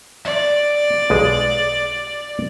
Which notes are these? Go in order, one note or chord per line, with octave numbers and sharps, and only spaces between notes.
D5 E5
B1 G#3 G#4